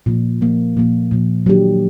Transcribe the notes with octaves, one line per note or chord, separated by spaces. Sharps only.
A#2 F3 A#3
A#2 F3 A#3
A#2 F3 A#3
A#2 F3 A#3
D#3 F#3 A#3 D4 G4